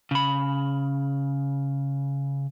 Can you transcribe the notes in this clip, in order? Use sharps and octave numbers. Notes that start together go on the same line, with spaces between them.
C#3 B5